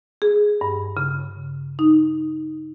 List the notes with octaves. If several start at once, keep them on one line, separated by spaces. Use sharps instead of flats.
G#4
G2
C#3
D#4